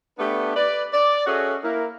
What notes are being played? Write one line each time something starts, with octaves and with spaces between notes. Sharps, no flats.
A3 B3 D4 G4 B4
B4 D5
D5
C#4 F#4 G#4 A4 D#5 E5
A#3 E4 A#4